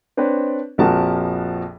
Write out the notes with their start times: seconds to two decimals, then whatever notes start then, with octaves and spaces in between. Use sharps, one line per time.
0.17 C4 D4 B4 C#5
0.78 A#1 F2 F3 F#4 A#4 A5